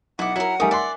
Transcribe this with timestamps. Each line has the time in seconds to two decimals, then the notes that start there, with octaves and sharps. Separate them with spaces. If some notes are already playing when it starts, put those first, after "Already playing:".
0.19 B1 E4 F#5 D6
0.36 F#3 E4 A#4
0.60 G3 A3 D#4 A#4 G#5 D#6
0.71 D5 E5 F#5 C6